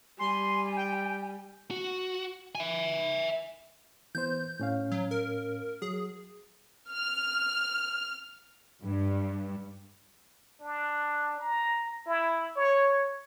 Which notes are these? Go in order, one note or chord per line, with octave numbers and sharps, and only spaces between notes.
G3 G#5 C6
G5
F#4
E5 G#5
E3 B3 C5 G6
A2 C#4 F5
F#3
A#4
F#3 G#4
F6
G2
D4
A#5
E4
C#5